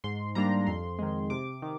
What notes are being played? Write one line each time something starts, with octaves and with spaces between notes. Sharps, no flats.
G#2 C6
G3 A#3 D4 A#5
F2 C6
D#3 G#3
C3 D6
D#3